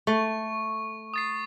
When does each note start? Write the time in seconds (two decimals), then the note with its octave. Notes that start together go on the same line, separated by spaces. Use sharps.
0.07 A3 C#6
1.14 D#6 A6 C7